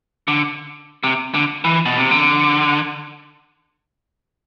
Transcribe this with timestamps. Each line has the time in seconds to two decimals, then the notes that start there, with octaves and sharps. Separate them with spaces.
0.28 D3
1.04 C3
1.34 D3
1.64 E3
1.86 B2
1.97 C3
2.11 D3